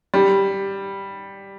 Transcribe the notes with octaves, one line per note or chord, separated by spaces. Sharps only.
G3